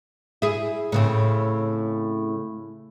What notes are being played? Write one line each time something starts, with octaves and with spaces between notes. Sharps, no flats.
E4 G#4
A2 C#3 C4